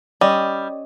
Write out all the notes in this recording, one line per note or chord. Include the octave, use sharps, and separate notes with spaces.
G3 C#4 D#5